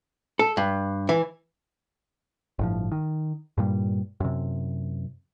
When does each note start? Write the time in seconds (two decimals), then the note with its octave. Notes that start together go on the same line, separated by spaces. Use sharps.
0.39 A4
0.57 G2
1.09 E3
2.59 G1 A2 F3
2.92 D#3
3.58 G2 A#2 G3
4.20 F#2 C3